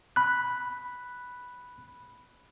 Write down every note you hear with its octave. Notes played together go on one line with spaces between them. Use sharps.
B5 F#6